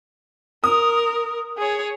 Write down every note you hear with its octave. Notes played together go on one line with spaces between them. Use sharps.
A#4 D#6
G#4 C#5